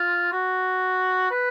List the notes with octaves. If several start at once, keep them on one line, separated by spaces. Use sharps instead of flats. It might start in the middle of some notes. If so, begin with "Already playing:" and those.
Already playing: F4
F#4
B4